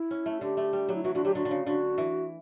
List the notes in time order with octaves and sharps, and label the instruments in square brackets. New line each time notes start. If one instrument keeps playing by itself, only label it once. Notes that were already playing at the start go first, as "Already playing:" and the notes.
Already playing: [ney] E4
[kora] C#4
A3
[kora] D3 [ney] G4
[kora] A3
G3
F#3
[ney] E4
[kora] E3 [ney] F#4
[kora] D3 [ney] F#4
[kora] F#3 [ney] G4
[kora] D3 [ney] F#4
[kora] D3
C#3
[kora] D3 [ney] F#4
[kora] E3